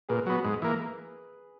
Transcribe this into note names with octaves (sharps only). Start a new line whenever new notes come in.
A#2 G#4 B4
F#3 B3
G#2
E3 A#3